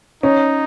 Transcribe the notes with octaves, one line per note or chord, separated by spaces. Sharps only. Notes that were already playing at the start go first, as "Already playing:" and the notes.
C#4 D#4